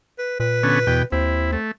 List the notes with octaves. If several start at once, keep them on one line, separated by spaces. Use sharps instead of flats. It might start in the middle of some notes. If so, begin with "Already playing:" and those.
B4
A#2 B4
D3 B3 C#4
E2 B2 G5
D#2 C4 E4
A3